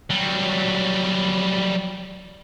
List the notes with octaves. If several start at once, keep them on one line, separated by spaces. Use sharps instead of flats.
F#3 G3